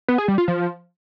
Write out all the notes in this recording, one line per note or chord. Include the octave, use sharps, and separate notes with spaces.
B3
G#4
G3
F4
F3